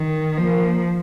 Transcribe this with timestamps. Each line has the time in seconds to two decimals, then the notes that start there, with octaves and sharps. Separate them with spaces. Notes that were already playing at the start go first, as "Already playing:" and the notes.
Already playing: D#3
0.37 F3 A#3